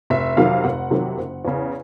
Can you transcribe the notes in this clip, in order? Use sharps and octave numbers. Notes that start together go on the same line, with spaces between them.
F1 E5
F2 C3 D#3 F#3 F5
F1 F#5
F2 C3 D#3 F#3
F#1
E2 C#3